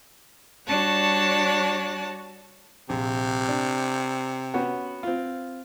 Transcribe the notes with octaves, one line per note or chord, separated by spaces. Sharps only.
G3 D4 F#4 C#5 A5 F#6
A#1 C3
D4
B3 C#4 F#4
C4 F4